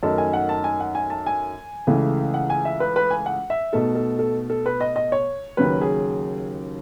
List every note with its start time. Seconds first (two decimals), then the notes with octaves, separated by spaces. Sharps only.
0.03 F#2 D#3 A3 D#4 A5
0.18 G#5
0.33 F#5
0.49 A5
0.64 G#5
0.80 F#5
0.95 G#5
1.10 A5
1.26 G#5
1.87 C#2 C#3 E3 A3
2.34 F#5
2.50 G#5
2.65 E5
2.80 B4
2.96 B4
3.11 G#5
3.26 F#5
3.50 E5
3.72 B2 A3 D#4 A4
3.95 A4
4.19 A4
4.50 A4
4.66 B4
4.81 D#5
4.96 D#5
5.12 C#5
5.57 D#2 C#3 F#3 C#4 B4
5.81 G#4